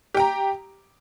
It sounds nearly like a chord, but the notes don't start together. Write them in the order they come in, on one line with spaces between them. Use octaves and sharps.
G4 G5 A#5